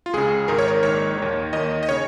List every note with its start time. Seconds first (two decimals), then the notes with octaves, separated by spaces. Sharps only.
0.06 F4
0.13 C#2 C#3 G#4
0.48 G#1 G#2 D#3 A#4
0.59 C#5
0.68 A#4
0.83 A#1 G#2 D#3 C#5
1.18 D#2 D#3
1.53 D#2 D#3 D#5
1.83 D#5
1.89 C#3 C#5